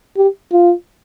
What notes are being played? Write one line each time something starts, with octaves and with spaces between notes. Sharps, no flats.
G4
F4